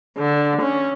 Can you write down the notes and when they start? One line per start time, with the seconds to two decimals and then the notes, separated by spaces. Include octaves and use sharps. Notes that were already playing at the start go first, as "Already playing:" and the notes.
0.18 D3
0.62 C#4